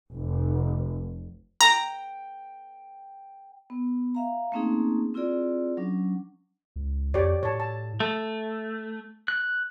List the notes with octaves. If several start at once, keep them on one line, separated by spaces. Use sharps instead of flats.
F1
G5 A#5
B3
E5 F5 A#5
A3 A#3 C4 C#4 D#4 G#4
C4 E4 F4 G#4 D5
F#3 C#4 D4
C#2
F2 G4 C#5 D5
A2 C#5 A5
A5
A3
F#6